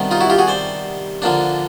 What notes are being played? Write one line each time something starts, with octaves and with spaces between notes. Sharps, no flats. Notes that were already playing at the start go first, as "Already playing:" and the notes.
Already playing: C3 D#3 G3 B3 D4
D#4 F4
E4 F#4
F4 G4
F#4 G#4
C5 D5
D3 F3 A#3 D4